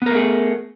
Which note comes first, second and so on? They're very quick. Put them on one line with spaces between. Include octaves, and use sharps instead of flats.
B3 A#4 A3 G#4